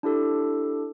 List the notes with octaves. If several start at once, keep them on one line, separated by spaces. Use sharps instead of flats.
D4 E4 G4 A4